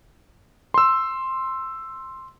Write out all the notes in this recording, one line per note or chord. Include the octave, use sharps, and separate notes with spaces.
C6 E6